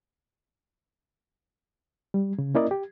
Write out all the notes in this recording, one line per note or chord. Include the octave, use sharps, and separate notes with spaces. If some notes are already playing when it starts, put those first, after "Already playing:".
G3
C#3
A#3 C#4 E4 A#4 D5 D#5
G4